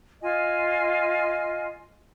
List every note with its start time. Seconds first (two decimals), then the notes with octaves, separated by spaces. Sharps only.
0.23 F4 D#5 G#5